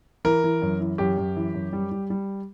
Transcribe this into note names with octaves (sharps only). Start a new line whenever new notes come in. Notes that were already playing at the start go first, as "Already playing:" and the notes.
E3 A#4
E3
F#2
E3
F#2 G4
F#2
E3
F#2
G3
G3
G3